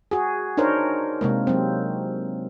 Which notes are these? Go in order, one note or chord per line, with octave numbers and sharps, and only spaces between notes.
F#4 G#4
D4 D#4 A#4 C5 C#5
C3 G#3 A#3
F#3 C4